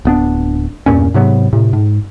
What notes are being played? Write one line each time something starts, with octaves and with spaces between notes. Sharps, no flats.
D1 B3 D4
E2 G2 A#2 C#4
G#2 C3 F#3 B3
A2 C3
G#2